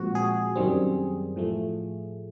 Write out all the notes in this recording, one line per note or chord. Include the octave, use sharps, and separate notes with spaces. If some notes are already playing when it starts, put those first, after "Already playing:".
Already playing: A#2 F3 G#3 C4 F#4
G#4
F#2 D#3 G3 C4
A2 F3 A3